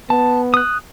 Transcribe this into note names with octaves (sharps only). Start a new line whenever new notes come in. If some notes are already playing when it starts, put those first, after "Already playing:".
B3 A5
D#6 F#6